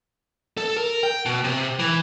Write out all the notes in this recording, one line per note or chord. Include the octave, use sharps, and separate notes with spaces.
A4
A#4
G5
B2
C3
E3